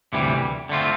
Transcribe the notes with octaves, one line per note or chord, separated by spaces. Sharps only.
D2 C3 E3 G3
D3 A3 C4 F4